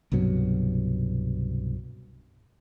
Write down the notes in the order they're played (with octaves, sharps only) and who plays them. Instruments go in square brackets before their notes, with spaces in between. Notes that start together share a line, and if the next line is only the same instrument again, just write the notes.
[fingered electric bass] C2 G2 B2 F#3